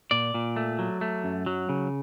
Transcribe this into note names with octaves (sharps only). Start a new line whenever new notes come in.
A#2 D5
A#2
A3
F#3
A3
F#2
F#3
C#3